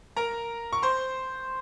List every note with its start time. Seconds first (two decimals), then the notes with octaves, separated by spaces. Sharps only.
0.17 A#4 A#5
0.73 C#6
0.83 C5 C6